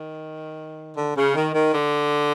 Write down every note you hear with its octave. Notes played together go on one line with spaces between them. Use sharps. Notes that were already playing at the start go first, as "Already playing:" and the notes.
Already playing: D#3
D3
C#3
D#3
D#3
D3